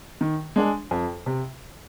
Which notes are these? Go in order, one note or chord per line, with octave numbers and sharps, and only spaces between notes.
D#3
G#3 D4 G#4
F2
C3